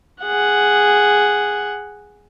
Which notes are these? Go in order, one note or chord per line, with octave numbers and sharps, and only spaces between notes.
G#4 F#5